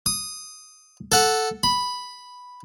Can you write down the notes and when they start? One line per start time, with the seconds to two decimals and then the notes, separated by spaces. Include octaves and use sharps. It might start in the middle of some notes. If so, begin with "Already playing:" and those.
0.06 D#6
1.12 A4 F#5
1.63 B5